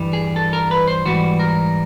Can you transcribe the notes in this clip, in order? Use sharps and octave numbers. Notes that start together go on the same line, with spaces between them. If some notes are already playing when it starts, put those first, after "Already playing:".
Already playing: G2 E3 G3
G#4
A4
A#4
B4
C5
G#2 E3 G3 F#4
A#4